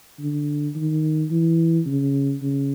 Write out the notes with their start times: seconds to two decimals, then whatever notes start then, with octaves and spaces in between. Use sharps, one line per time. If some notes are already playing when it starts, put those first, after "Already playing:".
0.19 D3
0.75 D#3
1.31 E3
1.86 C#3
2.42 C#3